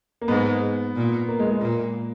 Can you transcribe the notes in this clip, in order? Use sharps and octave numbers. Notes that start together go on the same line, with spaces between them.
A#3
G#2 G#3 B3
A#2
A#3
G#3
G#3
A#2 A#3